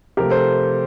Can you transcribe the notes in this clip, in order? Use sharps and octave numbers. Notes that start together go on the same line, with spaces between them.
C3 F3 A3 G4 A#4
A4 C5